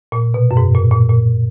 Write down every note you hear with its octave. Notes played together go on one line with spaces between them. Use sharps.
A#2
B2
F#2
G#2
A#2
A#2
A#2